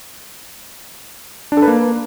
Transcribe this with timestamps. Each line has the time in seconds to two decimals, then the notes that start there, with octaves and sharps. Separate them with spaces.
1.52 D4
1.57 A4
1.62 B4
1.68 A#3